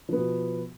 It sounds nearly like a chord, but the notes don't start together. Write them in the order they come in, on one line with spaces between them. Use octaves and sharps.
F3 B3 B2